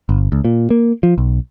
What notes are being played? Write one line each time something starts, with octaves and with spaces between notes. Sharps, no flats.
G1
C#2
A#2
A#3
F3
B1